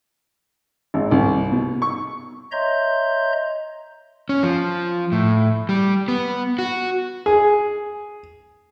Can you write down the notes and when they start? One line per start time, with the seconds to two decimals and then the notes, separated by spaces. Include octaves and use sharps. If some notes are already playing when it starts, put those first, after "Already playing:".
0.94 G#1
1.11 C2
1.51 B2
1.82 C#6
2.52 C#5 D#5 E5 A#5 C6 G6
4.29 C#4
4.43 F3
5.12 A2
5.69 G3
6.08 B3
6.59 F#4
7.26 G#4